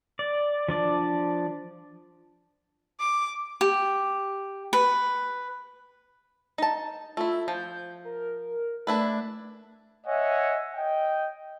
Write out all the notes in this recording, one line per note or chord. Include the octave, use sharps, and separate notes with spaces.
D5
F3 D4 D5
D6
G4
B4
D#4 A5
A3 E4 F4
F3 G6
A#4
A3 D4 E4 B4
C#5 D#5 E5 F#5 G#5
D#5 G5